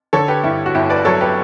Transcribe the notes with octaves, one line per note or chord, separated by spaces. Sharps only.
D3 A4 C#5
G4 B4
G2 E4 G4
F#4
G1 E4 G4
B4 D5
F#3 A4 C#5
G4 B4